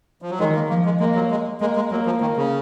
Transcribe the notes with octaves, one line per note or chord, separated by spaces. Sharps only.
F3
F#3
D#3 G#3
A#3
F3 A#3
G#3
G#3 A#3
F#3
G#3
G#3 A#3
G#3
F#3 A#3
F3
D#3 A#3
C#3